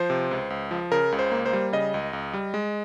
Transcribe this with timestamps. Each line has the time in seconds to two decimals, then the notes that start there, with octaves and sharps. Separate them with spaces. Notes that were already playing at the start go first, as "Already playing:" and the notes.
Already playing: F3 C5
0.10 C3
0.31 C#2
0.50 C#2
0.71 F3
0.91 C#3 A#4
1.12 C#2
1.19 C5
1.32 A#3
1.46 C5
1.53 G3
1.73 C#3 D#5
1.94 C#2
2.13 C#2
2.33 G3
2.54 G#3